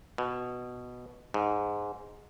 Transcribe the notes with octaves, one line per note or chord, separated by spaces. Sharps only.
B2
G#2